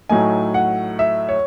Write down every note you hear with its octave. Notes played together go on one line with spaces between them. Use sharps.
A2 F#3 A3 D#4 G#5
F#5
E5
C#5